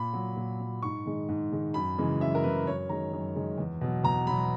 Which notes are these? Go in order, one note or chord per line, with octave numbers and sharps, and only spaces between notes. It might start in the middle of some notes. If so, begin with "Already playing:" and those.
Already playing: A#2 B5
F#3
A#2
F#3
G#2 C#6
D#3 G#3
G#2
D#3 G#3
F#2 B5
C#3 E3 G#3
F#2 E5
A#4
C#3 E3 G#3 B4
F#2 C#5
D#3 G#3 A#5
F#2
D#3 G#3
E2
B2 F#3
E2 A#5
B2 F#3 B5